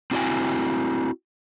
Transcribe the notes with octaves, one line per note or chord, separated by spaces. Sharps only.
C4 E4 F#4 D5 G5 G#5